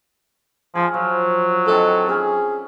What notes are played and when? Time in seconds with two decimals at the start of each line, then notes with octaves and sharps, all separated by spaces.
0.75 F3 F4 G#4
0.94 F3 F#3
1.67 D#3 C4 D4 A4
2.09 C#4 G#4 B5